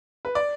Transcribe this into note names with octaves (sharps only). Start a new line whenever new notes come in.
B4
D5